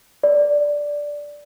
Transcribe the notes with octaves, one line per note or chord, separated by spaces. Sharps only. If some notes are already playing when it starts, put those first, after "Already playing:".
D5